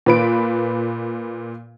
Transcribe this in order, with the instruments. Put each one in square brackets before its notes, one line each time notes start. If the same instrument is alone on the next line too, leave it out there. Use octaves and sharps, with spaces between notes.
[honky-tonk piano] A#2 B4 D7